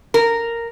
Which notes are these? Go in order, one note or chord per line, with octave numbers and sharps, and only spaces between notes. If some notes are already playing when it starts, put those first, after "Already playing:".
A#4